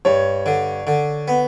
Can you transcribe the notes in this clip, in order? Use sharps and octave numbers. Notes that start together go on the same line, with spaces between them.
G2 C#5
D3
D3
B3